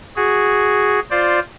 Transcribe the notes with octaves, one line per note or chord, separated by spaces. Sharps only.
F#4 G#4
F4 C5 D5